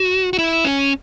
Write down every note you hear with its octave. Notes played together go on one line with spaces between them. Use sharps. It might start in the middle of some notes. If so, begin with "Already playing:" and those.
Already playing: F#4
F#4
E4
C#4